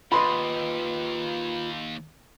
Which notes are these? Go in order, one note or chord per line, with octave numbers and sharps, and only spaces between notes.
D#2 F4 B4 D#5 B5 C6